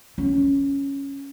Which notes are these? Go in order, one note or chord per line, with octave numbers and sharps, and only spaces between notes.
C#4